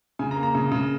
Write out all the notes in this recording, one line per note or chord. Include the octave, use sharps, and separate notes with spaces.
C#3 G#5
A#5
A#3
A#5
C#3
C#3